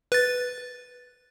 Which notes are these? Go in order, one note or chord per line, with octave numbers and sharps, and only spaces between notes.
B4 A6